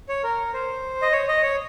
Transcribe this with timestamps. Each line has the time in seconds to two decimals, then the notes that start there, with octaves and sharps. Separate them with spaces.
0.09 C#5
0.24 A#4
0.54 C5
1.02 D#5
1.12 C#5
1.28 D#5
1.42 C#5